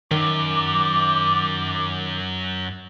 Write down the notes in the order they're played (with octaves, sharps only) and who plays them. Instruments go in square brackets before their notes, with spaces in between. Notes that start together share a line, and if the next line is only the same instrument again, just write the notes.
[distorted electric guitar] F#2 [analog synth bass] D#3 [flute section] D6